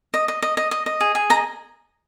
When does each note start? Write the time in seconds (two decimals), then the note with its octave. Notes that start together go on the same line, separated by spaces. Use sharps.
0.14 D#5
0.28 D#5
0.42 D#5
0.57 D#5
0.71 D#5
0.86 D#5
1.01 G#4
1.15 G#4
1.30 D#5 A#5